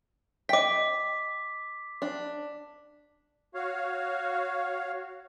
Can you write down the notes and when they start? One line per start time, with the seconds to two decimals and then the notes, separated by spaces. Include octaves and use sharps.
0.49 D#5 G5 D6 B6
2.02 D4
3.54 F#4 C#5 F5